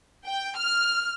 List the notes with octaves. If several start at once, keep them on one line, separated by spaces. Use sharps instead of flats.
G5
F6